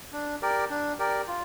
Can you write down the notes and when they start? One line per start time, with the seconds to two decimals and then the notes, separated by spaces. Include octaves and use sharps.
0.13 D4
0.42 G4 A#4 D5
0.70 D4
0.99 G4 A#4 D5
1.27 F4